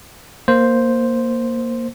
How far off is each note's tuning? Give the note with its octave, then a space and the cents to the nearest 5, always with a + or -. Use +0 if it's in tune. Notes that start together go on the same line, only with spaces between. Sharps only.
A#3 +0 C5 +0